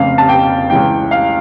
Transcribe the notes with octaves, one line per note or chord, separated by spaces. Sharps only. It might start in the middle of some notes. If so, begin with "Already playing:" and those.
Already playing: F1 F2 C#3 F5
A5
G5
C#2 C#3 E3 G5
F5